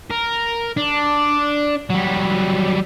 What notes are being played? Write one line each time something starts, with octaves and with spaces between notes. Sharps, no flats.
A#4
D4
F#3 G3